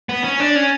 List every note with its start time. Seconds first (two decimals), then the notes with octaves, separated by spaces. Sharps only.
0.09 B3
0.24 C#4
0.40 D4
0.56 C#4